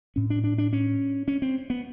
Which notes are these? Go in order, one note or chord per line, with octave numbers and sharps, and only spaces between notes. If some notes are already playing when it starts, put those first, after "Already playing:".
A2 C#4
D4
D4
D4
C#4
C#4
C4
B3